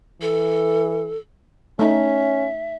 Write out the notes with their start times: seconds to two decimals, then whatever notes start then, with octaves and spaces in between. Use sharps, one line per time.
0.21 E3 A4
1.79 A3 C#4 D#4 E5